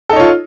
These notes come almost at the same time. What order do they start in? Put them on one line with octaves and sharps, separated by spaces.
A4 D#4 C#5 F4